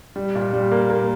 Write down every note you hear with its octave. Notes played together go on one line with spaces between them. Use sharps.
G3
A#2
G3
A#3
A#3